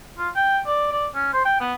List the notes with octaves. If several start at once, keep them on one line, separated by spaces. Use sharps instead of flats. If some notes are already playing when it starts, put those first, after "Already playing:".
F4
G5
D5
D5
C#4
C5
G5
B3